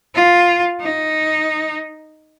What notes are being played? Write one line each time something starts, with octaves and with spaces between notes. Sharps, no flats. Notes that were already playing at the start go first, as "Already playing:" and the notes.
F4
D#4